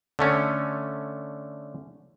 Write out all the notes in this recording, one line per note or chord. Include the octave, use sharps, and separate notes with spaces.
D3 A3 C#4